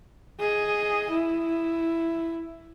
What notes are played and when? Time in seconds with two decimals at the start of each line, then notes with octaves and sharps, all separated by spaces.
0.40 G#4 D#5
1.10 E4